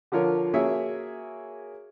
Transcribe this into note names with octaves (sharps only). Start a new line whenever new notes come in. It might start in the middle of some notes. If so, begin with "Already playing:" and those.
D3 F3 F4 A#4 C#5
A#3 F#4 G#4 C#5 E5